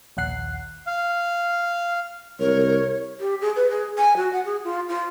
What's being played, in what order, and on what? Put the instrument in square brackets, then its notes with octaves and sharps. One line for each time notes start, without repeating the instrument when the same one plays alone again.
[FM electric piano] A#1 D#2 F#5 F#6 C7
[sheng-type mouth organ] F5
[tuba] C2 [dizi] A#4 [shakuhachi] C#5
[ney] G4
G#4
B4
G#4
G#5
F#4
F#5
G#4
F4
F4